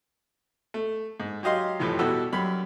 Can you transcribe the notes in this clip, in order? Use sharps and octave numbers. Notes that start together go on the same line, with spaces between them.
A3
G#2
F#3 G4 D#5 F5 C6
F2 A2 C3 E3 F3
B2 G3 E4 F#4 A4
F#2 G3 B5